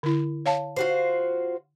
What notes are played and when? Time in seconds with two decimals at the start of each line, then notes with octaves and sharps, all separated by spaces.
0.03 D3 E4
0.46 C#5 F5 A5
0.76 F4 F#4 C5